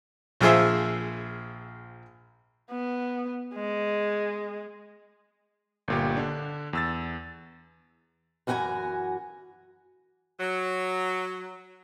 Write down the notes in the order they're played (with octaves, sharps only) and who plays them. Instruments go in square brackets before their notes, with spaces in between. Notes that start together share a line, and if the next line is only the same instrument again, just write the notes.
[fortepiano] A#1 F3 F4 G#4 C5 E5
[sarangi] B3
G#3
[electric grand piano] G1 A#2 G4
D3 D4
E2 E6 A6
[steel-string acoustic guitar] F#2 E3 F#4 G5 G#5 A#5
[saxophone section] F#3